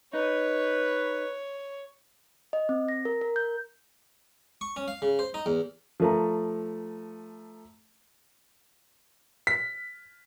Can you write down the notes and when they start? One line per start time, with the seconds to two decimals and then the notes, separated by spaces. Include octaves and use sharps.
0.13 D#4 B4 C#5
2.53 D#5
2.69 C4
2.89 A#6
3.05 A#4
3.21 A#4
3.36 G6
4.61 C#6
4.76 C#4
4.88 F5
5.02 C#3
5.19 C5
5.34 D#4
5.46 E2
6.00 F3 A3 A#5
9.47 B6